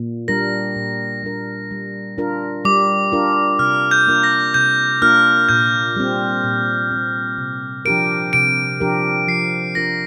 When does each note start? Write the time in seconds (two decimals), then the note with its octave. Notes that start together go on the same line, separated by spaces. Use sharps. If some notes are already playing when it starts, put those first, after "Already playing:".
Already playing: A#2
0.28 G3 D4 A#4 A#6
0.76 A#2
1.23 G3 D4 A#4
1.71 G3
2.18 D4 F4 A#4
2.65 G3 D6
3.12 D4 F4 A#4
3.59 C3 F6
3.91 G6
4.07 A#3 D4 F4 A#4
4.23 A#6
4.54 C3 G6
5.02 A#3 D4 F4 A#4 F6
5.49 A#2 G6
5.96 G3 C4
6.43 A#2
6.91 G3 C4
7.38 C3
7.85 F3 D4 G4 A#4 D7
8.33 C3 D7
8.80 F3 D4 G4 A#4
9.27 F3 C7
9.75 D4 F4 A#4 A#6